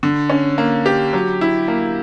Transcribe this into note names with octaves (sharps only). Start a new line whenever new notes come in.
D3
C#4
A#3
G4
F#3
E4
A#3